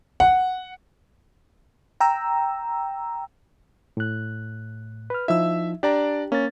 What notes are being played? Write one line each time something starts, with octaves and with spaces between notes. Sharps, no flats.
F#5
G5 A#5 E6
A2 F#6
B4 F6
F3 D#4 E4 E5 E6
D4 G4 D5 A#5
A#3 C#4 A6